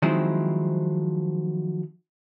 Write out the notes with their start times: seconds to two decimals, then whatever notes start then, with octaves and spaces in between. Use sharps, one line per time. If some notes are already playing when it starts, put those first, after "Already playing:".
0.02 D#3 F3 F#3 G#3 C4 E4